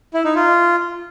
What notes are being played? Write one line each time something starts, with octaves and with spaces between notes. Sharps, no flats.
E4
D#4
F4